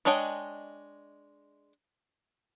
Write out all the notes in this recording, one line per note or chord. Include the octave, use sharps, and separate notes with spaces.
G#3 D4 C#5 D#5 G5